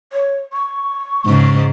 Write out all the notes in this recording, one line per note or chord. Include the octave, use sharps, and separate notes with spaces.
C#5
C#6
G#2 C#3